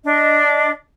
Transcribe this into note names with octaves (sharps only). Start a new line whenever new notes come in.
D4 D#5